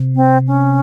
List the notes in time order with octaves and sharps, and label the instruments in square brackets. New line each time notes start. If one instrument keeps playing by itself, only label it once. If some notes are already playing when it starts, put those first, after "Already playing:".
Already playing: [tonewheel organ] C3
[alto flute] C4
C#4